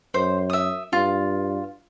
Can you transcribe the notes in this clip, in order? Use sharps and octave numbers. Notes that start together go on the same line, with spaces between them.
F#2 C5
E5 D#6
G2 F4